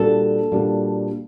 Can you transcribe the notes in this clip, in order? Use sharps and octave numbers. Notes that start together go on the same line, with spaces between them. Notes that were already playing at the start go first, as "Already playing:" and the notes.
Already playing: A#2 G3 A#3 D4 F#4 A4
A#2 G3 A#3 D4 F#4